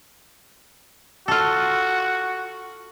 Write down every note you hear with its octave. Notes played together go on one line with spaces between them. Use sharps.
F4 F#4 A4